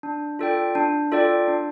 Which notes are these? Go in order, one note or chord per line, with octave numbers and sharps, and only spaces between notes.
D4
F4 A4 D5 G5
D4
F4 A4 D5 G5
D4